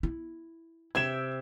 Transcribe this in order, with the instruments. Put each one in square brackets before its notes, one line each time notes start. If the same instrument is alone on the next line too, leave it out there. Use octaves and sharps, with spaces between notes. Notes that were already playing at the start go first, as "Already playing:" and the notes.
[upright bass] E4
[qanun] C3 E5 G5 [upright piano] G#6 E7